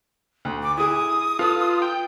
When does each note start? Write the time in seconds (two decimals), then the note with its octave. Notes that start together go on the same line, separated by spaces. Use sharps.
0.45 D2
0.63 D6
0.77 E4 G#4 D#6
1.39 F4 A4 B4
1.82 G5